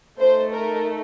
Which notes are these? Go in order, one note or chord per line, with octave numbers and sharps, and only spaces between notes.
A3 D#4 A4 C5
A#4